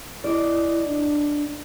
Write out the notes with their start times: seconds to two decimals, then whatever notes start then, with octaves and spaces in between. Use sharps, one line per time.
0.24 E4 D5 D#5
0.88 D4